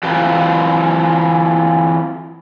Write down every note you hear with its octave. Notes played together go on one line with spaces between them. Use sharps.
E3 C4 F4 B4 C5